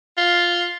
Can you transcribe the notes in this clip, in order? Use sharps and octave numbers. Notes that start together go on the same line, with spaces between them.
F4